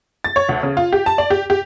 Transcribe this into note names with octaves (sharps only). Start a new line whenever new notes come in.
A6
C#5
D2
C#3
F4
G4
A5
D5
G4
G4